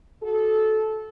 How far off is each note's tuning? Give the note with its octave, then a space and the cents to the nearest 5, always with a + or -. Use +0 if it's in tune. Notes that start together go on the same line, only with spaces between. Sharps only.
F#4 +0 A4 -15